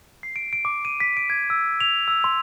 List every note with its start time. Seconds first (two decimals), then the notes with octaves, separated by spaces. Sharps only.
0.23 C7
0.36 D7
0.53 D7
0.65 D6
0.85 D#7
1.00 B6
1.17 D7
1.30 G#6
1.50 E6
1.81 F7
2.08 E6
2.24 C6